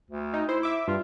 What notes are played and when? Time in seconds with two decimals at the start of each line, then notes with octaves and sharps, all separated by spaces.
0.11 D2
0.34 D#4
0.49 E4 C5
0.63 E5 D6
0.88 G2 F4